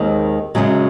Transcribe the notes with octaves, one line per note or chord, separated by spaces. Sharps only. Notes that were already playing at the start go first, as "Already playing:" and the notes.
Already playing: D#2 D#3 G#3 C4
F#2 C#3 F#3 G#3 G#4